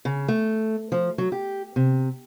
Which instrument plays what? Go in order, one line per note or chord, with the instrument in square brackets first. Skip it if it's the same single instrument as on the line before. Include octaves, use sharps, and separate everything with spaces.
[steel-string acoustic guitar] C#3
A3
F3
F#3
G4
C3